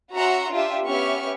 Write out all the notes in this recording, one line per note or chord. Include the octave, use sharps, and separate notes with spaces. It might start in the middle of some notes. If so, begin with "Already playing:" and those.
C#4 F#4 E5 F#5 A#5 C6
D4 F4 G4 E5
B3 C#4 G4 E5 C#6 F6